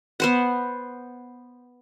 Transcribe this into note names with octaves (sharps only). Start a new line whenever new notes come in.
B3 C5 F#5